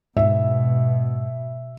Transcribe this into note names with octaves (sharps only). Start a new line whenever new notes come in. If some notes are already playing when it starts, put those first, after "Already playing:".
G#2 B2 E5